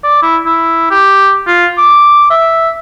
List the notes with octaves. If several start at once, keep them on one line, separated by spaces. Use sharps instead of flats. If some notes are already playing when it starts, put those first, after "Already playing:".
D5
E4
E4
G4
F4
D6
E5